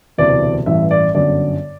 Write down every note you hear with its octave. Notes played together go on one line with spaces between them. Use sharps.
E1 D2 C3 E3 D5
A1 G2 E3 E5
D5
G1 F#2 D3 D5